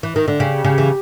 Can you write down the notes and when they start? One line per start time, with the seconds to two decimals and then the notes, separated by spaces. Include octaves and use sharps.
0.03 E3
0.16 D#3
0.28 D3
0.40 C#3 G4
0.64 C#3
0.78 E3